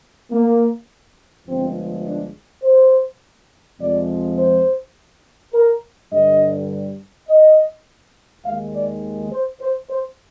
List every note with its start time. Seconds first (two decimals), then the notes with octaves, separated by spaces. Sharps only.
0.31 A#3
1.47 G1 G2 F3 G#3 C4
2.05 D4
2.63 C5
3.79 F2 C3 F3 G#3 D5
4.38 C5
5.54 A#4
6.12 G2 D3 G3 D#5
7.29 D#5
8.45 D#2 D#3 G#3 F5
8.74 D5
9.32 C5
9.61 C5
9.90 C5